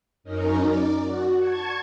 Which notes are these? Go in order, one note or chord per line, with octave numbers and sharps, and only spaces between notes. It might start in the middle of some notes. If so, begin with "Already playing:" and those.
F#2 C#4 D#4 A#4
D5
F#4
A5 C#6 G#6